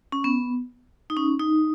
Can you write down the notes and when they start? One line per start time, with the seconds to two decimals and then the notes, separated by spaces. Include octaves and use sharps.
0.12 C#4
0.24 B3
1.10 D#4
1.17 C#4
1.40 D#4